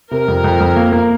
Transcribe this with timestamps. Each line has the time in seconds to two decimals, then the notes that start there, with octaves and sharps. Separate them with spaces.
0.11 C3 A#4
0.28 F2
0.44 F2
0.60 F2
0.76 A#3
0.92 A#3